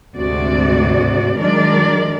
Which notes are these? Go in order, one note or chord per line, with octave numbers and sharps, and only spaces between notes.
D2 G#2 C3 F#4 D5
D#3 F#3 G#3 D4 A#4 D5